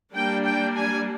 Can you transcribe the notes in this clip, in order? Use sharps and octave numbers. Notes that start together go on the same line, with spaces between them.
G3 A#3 D4 G5
G5
G#5